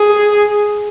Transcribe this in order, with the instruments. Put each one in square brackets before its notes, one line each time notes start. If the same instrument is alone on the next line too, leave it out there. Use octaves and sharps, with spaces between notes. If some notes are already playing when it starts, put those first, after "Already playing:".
Already playing: [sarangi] G#4